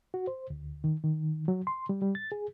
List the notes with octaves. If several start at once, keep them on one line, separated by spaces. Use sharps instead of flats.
F#4
C5
D2
D#3
D#3
F#3
C6
G3
G3
A6
G#4